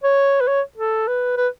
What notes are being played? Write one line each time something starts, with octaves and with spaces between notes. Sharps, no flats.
C#5
B4
C#5
A4
B4
B4